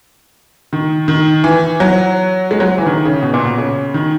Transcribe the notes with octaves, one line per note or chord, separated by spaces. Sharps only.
D#3
D#3
E3
F#3
G#3
F#3
E3
D#3
C#3
B2
A#2
B2
C#3
D#3